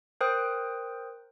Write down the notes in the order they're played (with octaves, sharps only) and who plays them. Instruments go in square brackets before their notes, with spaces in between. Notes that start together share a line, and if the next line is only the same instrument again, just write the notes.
[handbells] A#4 C5 G5 D#6 F#6